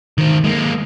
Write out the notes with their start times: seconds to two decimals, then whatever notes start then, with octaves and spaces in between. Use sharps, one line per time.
0.18 D#3 C5
0.44 G#3 A#3